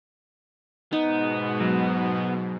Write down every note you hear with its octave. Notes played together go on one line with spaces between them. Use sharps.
G#2 B2 B3 D#4
F#3